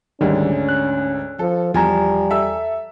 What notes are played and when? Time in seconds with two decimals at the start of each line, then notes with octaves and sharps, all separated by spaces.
0.21 D2 G#2 D3 D#3 G3 C#4
0.69 F#6
1.39 F3 A4
1.74 E2 F3 G3 G#5 A#5
2.30 A4 E5 E6